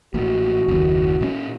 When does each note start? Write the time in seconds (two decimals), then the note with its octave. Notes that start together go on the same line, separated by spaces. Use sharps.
0.14 A1 A#2 F#4
0.68 F#1 D#2
1.21 A#2 G#3 C#4